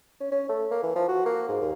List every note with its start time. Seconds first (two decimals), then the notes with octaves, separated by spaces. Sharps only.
0.20 C#4
0.32 C#4
0.49 A3
0.71 A#3
0.83 E3
0.96 F3
1.09 F#4
1.26 A#3
1.49 G#2
1.61 D#2